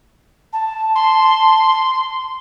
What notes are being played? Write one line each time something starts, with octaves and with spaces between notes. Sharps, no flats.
A5
C6